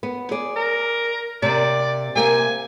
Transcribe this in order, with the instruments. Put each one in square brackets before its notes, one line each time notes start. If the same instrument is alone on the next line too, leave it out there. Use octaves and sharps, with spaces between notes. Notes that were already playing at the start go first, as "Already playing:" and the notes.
[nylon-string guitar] B3
G#4 D5
[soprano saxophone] A#4
[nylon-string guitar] C3 A#3 [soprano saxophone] D5
[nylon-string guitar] C3 A#3 [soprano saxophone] G#5